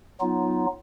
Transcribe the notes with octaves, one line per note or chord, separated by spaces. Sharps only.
F#3 B3 D#4 F4